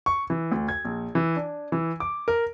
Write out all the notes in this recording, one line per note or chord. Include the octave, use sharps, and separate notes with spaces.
C#6
E3
D2
G#6
A#1
E3
D4
E3
D6
A#4